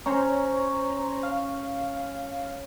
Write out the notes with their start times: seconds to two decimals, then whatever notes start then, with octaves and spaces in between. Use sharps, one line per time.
0.06 C#4 C5 C#5 A#5
1.23 F5